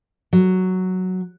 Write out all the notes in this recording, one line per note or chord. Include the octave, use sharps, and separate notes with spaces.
F#3